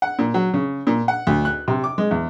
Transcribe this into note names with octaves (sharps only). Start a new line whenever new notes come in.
F#5
A#2
F#3
C#3
A#2
F#5
D2
F#6
C3
D6
G#3
E2